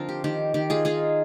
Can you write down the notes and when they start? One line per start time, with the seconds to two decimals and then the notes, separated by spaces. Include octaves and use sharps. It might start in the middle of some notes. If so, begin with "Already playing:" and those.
Already playing: D3 F3 C4 F4 A#4
0.09 G4
0.24 D#3 G4
0.54 D#3 G4
0.70 F4 G#4
0.85 D#4 F4 G#4